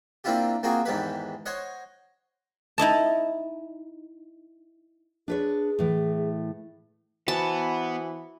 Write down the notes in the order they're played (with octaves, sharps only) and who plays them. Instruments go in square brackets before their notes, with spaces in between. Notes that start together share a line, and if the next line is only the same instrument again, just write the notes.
[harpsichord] A#3 C4 D4 E4 F4 G4
A#3 C4 F4 F#4 G#4
E2 G#2 D#3 G4 B4
C5 C#5 D#5 F#5
[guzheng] D#4 E4 D#5 A5
[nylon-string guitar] D4 B4 C#5 [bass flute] G#4
[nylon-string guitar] A2 E3
[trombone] E3 [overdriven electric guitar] B3 [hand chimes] F#4 C5 [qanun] A5